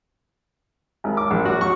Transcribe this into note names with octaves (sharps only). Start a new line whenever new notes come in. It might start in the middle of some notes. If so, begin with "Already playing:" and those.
G#1
D6
A#1
F#4
C#6